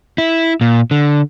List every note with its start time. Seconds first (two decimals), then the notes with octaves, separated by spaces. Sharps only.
0.18 E4
0.61 A#2
0.91 D3